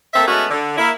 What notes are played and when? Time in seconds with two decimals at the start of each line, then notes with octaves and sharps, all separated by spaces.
0.14 A3 A#3 C4 A4 E5
0.27 G#3 A3 B3 C#4 F#4
0.50 D3
0.77 A#3 E4